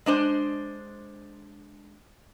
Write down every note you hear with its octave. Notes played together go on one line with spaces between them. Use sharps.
G#3 D4 C5